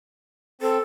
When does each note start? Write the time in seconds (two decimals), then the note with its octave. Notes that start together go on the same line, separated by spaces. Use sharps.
0.61 C4 A4